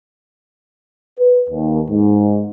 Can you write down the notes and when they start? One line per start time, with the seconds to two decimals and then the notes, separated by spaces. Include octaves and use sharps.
1.19 B4
1.49 D#2
1.90 G#2